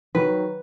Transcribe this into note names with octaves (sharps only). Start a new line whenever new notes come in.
D#3 F#3 B4